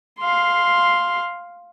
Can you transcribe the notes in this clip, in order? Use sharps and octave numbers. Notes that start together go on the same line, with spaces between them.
F5 C6